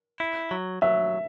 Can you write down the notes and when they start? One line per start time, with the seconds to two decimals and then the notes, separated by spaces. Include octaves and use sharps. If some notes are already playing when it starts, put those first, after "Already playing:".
0.20 E4
0.51 F#3
0.82 F#3 E5